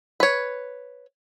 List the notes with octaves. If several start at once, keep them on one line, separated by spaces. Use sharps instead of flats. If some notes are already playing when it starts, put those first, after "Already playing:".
B4 C#5